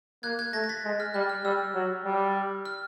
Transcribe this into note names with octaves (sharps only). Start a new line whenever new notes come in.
A#3 F#6 G#6
F#6 G#6
A3 G#6 A#6
A#6
A6 B6
G#3
F6
G3 F#6
F6
G3 E6
F#3
G3
F6